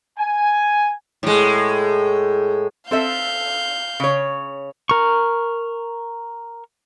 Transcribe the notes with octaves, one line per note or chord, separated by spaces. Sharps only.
G#5
A2 G#3
C4 A4 E5 F5 G6
C#3 C#5
A#4 C#6